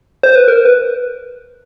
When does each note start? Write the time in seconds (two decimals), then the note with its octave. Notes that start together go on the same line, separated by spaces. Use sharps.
0.23 C5
0.36 B4
0.48 A#4
0.65 B4